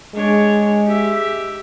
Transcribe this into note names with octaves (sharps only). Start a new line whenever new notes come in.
G#3 D4 C#5
G4 E5